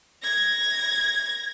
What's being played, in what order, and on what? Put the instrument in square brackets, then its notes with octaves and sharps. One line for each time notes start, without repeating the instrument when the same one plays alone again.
[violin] G#6 A#6